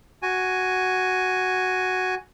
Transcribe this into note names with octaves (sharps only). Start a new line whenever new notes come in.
F#4 G#5